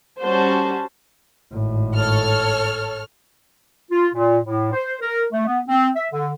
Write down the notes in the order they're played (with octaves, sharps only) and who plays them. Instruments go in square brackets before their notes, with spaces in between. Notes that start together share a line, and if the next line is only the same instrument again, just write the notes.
[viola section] G3 C#4 F#4 C5 A5
[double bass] G#1 A2
[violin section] A4 C#5 F6
[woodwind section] F4
A#2
A2
C5
A#4
A3
B3
C4
E5
D3